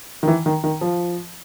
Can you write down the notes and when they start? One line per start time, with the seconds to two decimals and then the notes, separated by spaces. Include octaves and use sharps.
0.23 D#3
0.28 E3
0.46 D#3
0.64 D#3
0.81 F3